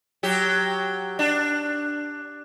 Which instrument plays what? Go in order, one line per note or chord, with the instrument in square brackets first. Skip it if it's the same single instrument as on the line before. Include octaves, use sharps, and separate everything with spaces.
[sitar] F#3 G4
D4